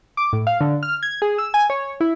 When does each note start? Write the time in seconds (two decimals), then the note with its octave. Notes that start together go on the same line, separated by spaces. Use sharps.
0.17 D6
0.33 A2
0.47 F5
0.61 D3
0.83 F6
1.03 G#6
1.22 G#4
1.38 E6
1.54 G#5
1.70 C#5
2.01 E4